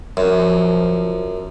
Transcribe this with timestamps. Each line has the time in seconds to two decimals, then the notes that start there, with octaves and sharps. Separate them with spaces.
0.17 F#2 F3